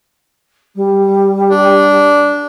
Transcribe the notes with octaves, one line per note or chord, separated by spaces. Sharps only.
G3
D4